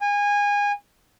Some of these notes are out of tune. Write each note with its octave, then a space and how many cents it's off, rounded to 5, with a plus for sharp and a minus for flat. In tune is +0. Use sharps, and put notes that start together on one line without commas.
G#5 -25